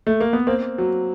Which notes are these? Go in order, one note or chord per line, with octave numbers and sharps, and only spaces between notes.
A3
A#3
B3
A#3 C4
F#3